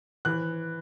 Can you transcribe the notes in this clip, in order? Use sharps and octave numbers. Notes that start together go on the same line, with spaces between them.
E3 F#6